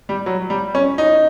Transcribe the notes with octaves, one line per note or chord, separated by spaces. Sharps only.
G3
F#3
G3
C#4
D#4